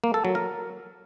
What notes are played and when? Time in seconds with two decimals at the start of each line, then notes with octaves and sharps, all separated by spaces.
0.04 A#3
0.14 A4
0.25 F#3
0.35 A#4